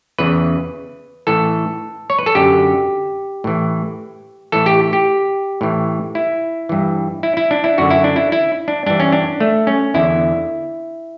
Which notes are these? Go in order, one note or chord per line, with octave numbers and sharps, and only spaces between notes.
E2 C#3 E3 B4
A2 E3 A4
C#5
B4
A4
F#2 D3 G4
A2 E3
A2 E3 A4
G4
G4
A2 E3
E4
G2 E3
E4
E4
D4
E4
F#2 D3 F#4
E4
D4
E4
E4
D4
G2 E3 D4
C#4
D4
A3
C#4
E2 D3 E4